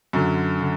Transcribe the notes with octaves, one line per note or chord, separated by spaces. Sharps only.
F#2 D3 F#3
D3